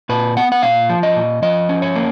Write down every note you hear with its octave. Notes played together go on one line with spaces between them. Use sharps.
A#2 B4
B3 F#5
F#5
A#2 F5
F3
D#5
A#2
F3 D#5
C#4
C#5
A#3